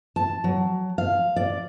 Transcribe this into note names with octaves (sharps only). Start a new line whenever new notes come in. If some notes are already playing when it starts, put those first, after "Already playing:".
A5
F#3
F5
D5